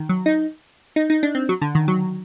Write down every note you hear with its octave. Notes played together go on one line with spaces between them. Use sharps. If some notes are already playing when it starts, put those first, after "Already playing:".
Already playing: D#3
F#3
D#4
D#4
D#4
D4
C4
F#3
D3
D#3
F#3